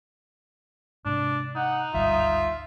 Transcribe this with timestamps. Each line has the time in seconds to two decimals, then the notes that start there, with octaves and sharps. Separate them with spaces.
1.05 G#2 C3 D4
1.56 D#4 F#5
1.94 G#1 D2 G2 F4 E5